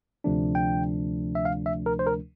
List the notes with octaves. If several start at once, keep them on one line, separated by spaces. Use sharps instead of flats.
D2 C3 F3 A3 D4
G5
E5
F5
E5
A#4
C5
A#4